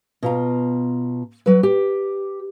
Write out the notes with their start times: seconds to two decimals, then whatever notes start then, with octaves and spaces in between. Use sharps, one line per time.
0.23 B2 F4 A#5
1.46 F#3 B4
1.63 G4